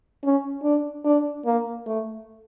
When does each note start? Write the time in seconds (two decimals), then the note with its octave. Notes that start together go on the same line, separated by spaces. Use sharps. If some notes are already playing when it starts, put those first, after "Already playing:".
0.23 C#4
0.63 D4
1.05 D4
1.45 A#3
1.86 A3